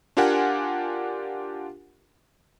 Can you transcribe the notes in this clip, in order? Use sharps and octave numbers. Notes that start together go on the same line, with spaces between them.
D4 F4 G4 A#4 F#5 G#5